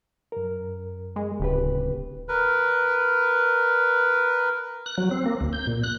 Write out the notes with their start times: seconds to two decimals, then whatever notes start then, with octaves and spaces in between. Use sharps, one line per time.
0.32 F#2 A#4
1.16 G#3
1.40 D1 C#3 G4 B4
2.29 A#4 B4
4.86 F#6
4.98 F#3
5.11 C4
5.26 A#3
5.41 D2
5.53 G6
5.67 A#2
5.83 F#6